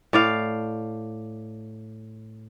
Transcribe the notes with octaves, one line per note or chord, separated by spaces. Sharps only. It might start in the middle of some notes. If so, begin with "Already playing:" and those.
A2 D5 F5